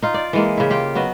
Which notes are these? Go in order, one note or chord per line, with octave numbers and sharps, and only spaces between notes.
D#4 F4
D5
E3 G#3 A#3
C#3 E4
F4 G4 G5
F#3 B3 D#5